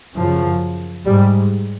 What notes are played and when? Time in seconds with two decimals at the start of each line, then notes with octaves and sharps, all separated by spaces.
0.16 F#2 C#3 F3
1.06 G#2 G3